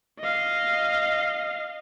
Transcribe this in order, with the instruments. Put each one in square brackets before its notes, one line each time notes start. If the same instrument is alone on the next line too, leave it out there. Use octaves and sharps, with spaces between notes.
[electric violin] D#5 F5